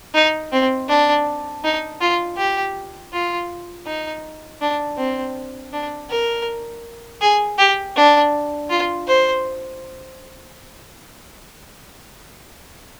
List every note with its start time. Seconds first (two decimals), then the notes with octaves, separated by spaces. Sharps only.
0.14 D#4
0.53 C4
0.89 D4
1.64 D#4
2.01 F4
2.37 G4
3.13 F4
3.86 D#4
4.61 D4
4.97 C4
5.73 D4
6.10 A#4
7.21 G#4
7.59 G4
7.96 D4
8.70 F4
9.08 C5